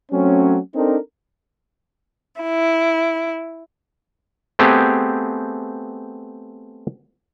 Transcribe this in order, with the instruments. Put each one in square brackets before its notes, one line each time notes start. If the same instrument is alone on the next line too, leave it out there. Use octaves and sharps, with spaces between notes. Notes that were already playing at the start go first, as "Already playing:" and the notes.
[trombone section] F#3 A3 C4 C#4
C4 D4 D#4 A4 A#4
[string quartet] E4
[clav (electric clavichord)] A3 B3 C4 G4 G#4